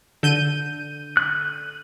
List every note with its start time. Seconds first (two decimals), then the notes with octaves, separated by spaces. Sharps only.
0.23 D3 G6 D#7
1.17 F#6